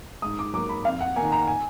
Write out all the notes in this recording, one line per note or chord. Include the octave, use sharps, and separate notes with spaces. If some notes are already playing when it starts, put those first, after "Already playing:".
G#2 D#6
D6
F#3 A#3 D6
B5
F2 F5
F#5
D#3 A#3 G#5
A#5
G#5